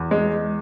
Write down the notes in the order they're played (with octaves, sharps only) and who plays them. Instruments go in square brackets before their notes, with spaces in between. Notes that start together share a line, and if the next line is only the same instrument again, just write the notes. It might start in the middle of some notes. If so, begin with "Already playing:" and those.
Already playing: [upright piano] E2
G#3